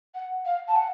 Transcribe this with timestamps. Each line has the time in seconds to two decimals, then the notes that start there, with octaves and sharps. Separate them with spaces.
0.15 F#5
0.46 F5
0.68 A5
0.76 F#5